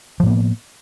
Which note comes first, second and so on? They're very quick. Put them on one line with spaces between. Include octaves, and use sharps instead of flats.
F3 A2 A#3 B3